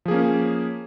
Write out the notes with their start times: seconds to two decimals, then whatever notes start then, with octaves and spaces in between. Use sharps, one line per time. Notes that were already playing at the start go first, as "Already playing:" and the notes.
0.05 F3
0.08 G#4
0.11 A#3
0.14 C#4